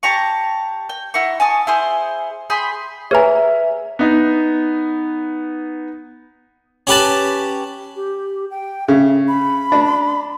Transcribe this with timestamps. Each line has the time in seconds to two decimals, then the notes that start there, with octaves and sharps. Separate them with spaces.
0.03 G4 A5 A#5 C#6
0.89 G5
1.14 E4 F#5 A#5 C#6
1.40 G#5 A5 C#6 D#6
1.67 E4 G#4 C5
2.50 G#4 G5 B5 C6
3.11 G#4 B4 C#5 E5 G#5 A#5
3.99 B3 D#4
6.87 C#4 G4 B4 A5
7.96 G4
8.51 G5
8.88 C#3 E5
9.28 B5
9.72 D4